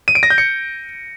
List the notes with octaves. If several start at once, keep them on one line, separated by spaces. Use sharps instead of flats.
D#7
D7
A#6
G6
C#7